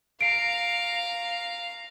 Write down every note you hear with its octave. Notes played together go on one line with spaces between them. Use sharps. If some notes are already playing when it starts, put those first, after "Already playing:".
F5 A#5 C7 D7